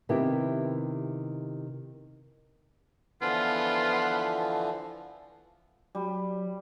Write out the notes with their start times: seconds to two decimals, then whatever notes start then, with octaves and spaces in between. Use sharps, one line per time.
0.09 C3 D#3 B3 E4 G4
3.22 D3 E3 F3 B3 F4
5.95 F#3 G3